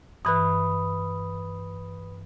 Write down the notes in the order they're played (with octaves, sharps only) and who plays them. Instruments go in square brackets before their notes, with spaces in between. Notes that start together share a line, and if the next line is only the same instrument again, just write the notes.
[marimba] G2 E3 F#6 [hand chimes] B4 B5 D#6